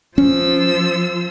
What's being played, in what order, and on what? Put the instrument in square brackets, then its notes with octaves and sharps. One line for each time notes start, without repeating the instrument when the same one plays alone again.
[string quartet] F3 E6 [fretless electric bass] C#4